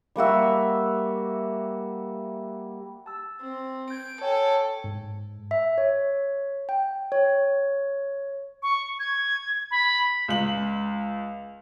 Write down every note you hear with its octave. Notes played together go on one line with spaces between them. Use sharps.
G3 A#3 F#4 E5
A5 E6
C4
G6 G#6 D7
A4 C#5 G5 G#5
G#2
E5
C#5
G5
C#5
C#6
G#6
B5
C#2 F#7